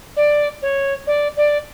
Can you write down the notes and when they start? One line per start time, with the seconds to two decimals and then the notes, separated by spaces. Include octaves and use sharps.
0.16 D5
0.62 C#5
1.07 D5
1.37 D5